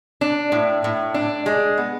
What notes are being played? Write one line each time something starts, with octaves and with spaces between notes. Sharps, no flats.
D4
A2
A2
D4
G#3
B3